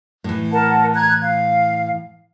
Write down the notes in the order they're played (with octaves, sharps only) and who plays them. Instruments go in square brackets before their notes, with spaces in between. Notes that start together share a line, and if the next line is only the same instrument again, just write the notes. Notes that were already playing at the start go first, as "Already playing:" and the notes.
[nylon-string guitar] A2 E3
[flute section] A#4 F#5 A5
A#5 F#6 G#6
F5